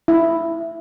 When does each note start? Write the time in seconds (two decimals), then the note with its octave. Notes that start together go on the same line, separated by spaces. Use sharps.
0.08 E4